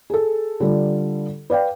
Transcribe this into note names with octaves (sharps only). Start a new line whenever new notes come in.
G#4 A4
D3 G3 F4 A4
B4 D5 F5 G5